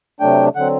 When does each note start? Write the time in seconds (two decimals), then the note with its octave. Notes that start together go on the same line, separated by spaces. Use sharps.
0.20 C3 F#3 A3 D4 G5
0.55 D3 F#3 C4 F#5